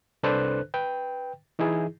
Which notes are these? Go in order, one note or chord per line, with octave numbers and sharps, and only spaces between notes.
C2 D4 A4 B4 C5 F#6
B4 G5
E3 D#4 E4 G#4